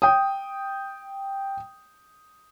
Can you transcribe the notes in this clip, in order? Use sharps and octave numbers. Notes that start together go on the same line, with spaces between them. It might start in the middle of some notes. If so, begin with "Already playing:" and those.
G5 D#6